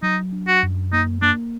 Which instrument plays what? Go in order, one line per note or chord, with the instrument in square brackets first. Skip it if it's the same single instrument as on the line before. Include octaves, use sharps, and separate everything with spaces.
[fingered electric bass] F#3 [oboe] D#4
[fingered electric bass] D4
[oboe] F#4
[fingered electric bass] F#2
[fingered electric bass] A#3 [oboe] D#4
[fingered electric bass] A#3 [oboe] D4